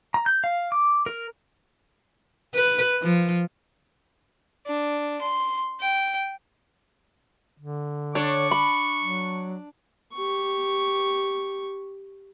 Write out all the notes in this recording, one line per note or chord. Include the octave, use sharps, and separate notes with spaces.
A#5
G6
F5
D6
A#4
B4
F3
D4
C6
G5
D3
D4 C#5 C#6
B5
F#3
G4 C#6